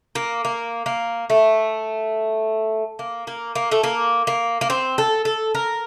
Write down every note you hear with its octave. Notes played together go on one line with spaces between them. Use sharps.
A#3
A#3
A#3
A3
A#3
A#3
A#3
A3
A#3
A#3
A#3
C4
A4
A4
A#4